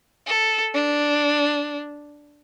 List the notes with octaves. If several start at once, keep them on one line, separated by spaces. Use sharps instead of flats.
A4
D4